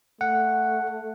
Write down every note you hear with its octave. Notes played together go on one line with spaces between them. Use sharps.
A3 F#5